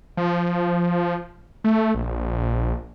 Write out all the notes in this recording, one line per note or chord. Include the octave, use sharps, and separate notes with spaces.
F3
A3
A#1